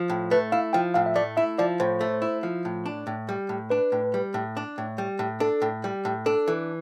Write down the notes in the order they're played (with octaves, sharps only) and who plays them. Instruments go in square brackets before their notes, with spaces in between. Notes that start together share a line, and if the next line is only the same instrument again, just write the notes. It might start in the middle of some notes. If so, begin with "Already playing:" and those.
Already playing: [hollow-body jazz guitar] F3
A2
[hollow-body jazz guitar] A3 [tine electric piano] B4
[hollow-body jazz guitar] E4 [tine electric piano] F5
[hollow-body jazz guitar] F3 [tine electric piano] G5
[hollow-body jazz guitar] A2 [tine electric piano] F5
[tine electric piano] E5
[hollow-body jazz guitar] A3 [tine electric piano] D5
[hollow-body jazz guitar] E4 [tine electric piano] E5
[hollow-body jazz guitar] F3 [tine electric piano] D5
[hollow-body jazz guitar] A2 [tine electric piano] C5
[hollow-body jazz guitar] A3
E4
F3
A2
D4
A2
G3
A2
[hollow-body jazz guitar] D4 [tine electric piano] B4
[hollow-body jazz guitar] A2
G3
A2
D4
A2
G3
A2
[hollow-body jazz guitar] D4 [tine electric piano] A4
[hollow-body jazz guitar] A2
G3
A2
[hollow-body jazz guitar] D4 [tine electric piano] A4
[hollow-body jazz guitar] E3